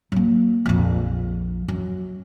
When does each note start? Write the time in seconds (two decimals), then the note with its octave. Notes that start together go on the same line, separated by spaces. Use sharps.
0.12 F#3 A#3
0.66 A#1 F2
1.68 F#2